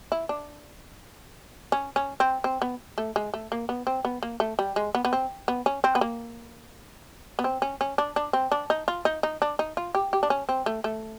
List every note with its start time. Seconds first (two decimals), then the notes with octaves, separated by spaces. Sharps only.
0.12 E4
0.29 D4
1.72 C#4
1.96 C#4
2.20 C4
2.44 C4
2.62 B3
2.98 A3
3.16 G#3
3.34 A3
3.52 A#3
3.69 B3
3.87 C4
4.05 B3
4.23 A#3
4.40 A3
4.59 G3
4.76 G#3
4.95 B3
5.05 B3
5.13 C4
5.48 B3
5.66 C#4
5.84 C4
5.95 B3
6.01 A#3
7.39 B3
7.44 C4
7.62 C#4
7.81 C#4
7.98 D4
8.16 D4
8.33 C4
8.52 D4
8.70 D#4
8.88 F4
9.05 D#4
9.23 D#4
9.42 D4
9.59 D#4
9.77 F4
9.95 G4
10.13 G4
10.23 D4
10.30 C#4
10.49 C4
10.66 A3
10.84 A3